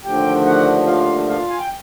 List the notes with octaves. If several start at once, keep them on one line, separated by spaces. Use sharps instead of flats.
D#2 D3 F3 A3 D4 G4 G5
F#4 F#5
F4 F5
F4 F5
G#5
G5